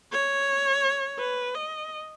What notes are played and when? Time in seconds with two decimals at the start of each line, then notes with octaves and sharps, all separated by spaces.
0.12 C#5
1.19 B4
1.55 D#5